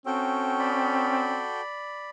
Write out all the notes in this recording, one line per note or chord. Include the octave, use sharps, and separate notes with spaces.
C4 C#4 F#4 A4 G5
D5 B5